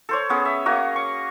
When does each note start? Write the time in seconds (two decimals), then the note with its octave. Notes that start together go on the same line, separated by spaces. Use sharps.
0.09 A4 C5 C#5
0.30 B3 C#4 G#4
0.45 E5
0.66 A#3 F#4 C#5 D#6
0.96 C#6